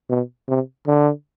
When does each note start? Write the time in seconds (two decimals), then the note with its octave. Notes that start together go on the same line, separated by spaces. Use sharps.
0.09 B2
0.48 C3
0.87 D3